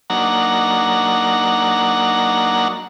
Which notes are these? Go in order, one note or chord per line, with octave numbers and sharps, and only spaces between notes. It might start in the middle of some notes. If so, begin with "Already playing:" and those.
F#3 A#3 D4 D#4 F#5 A#5